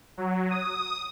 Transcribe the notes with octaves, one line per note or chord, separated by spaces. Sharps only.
F#3
D#6